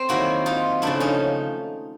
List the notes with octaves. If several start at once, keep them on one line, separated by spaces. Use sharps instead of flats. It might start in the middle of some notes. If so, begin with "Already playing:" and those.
Already playing: C4
D#3 F#3 A#3 E4 F#4
D#4 F4
C#3 F3 A3 D4 E4
C#4 D#4